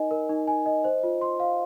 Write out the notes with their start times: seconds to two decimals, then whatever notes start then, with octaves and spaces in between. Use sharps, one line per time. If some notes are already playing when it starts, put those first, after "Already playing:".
Already playing: D#4 A#4 D#5 G#5
0.11 A#4
0.29 D#4
0.47 G#5
0.66 D#5
0.84 C5
1.03 F4
1.21 C6
1.40 F5